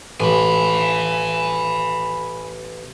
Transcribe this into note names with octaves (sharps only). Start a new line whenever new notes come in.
A1 G#5 B5